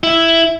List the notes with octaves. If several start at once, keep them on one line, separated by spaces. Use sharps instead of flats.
E4